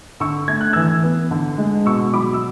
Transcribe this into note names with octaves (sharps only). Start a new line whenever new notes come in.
D3 C#6 E6
A3 G#6
F#6
E3 E6 G#6
B3
D3
G#3
B2 C#6 E6
F#3 B5 D6
E6